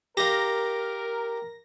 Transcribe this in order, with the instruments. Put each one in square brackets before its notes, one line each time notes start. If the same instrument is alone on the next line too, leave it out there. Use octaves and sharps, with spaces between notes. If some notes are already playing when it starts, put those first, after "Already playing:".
[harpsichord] G4 F5 [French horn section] A#4 [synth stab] A#6